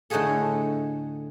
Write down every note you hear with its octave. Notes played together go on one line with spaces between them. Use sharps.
A2 D3 D#4 F#4 G#4 A4